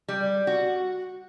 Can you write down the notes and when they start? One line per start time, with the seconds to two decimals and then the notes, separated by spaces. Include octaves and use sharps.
0.08 G3
0.47 F#4